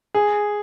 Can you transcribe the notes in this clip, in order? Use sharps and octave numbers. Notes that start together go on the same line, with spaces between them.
G#4